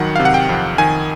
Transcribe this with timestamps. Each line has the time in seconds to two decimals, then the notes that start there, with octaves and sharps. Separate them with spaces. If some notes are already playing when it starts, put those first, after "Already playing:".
Already playing: F2 D#3 F#3 F#5
0.16 C3 F5
0.25 F#5
0.34 G5
0.49 F2
0.78 D#3 G#5